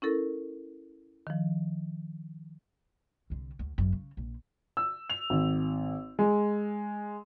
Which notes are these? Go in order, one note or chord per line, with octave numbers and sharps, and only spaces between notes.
C#4 E4 A4 A#4
D#3 F3
C2 D3
D2
G#1 F#2
C#3
A#1
E6
F7
G#1
G#3